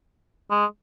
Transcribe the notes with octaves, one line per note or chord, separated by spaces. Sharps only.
G#3